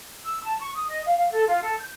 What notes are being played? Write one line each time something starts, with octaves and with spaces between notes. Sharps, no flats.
E6
A5
C#6
D#6
D#5
F5
F5
A4
F4
A4
G6